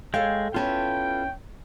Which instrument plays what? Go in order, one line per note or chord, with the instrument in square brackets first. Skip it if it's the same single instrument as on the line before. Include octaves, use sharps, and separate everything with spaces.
[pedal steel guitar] G#3 G5 [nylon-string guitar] A4 C#5 F5
[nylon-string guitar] B3 C#4 E4 [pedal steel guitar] F4 A4 B4 [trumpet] G5